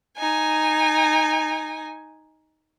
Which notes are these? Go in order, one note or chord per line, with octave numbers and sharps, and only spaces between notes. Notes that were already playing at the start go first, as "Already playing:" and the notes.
D#4 G#5